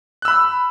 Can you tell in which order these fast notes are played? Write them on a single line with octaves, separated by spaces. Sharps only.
F#6 E6 B5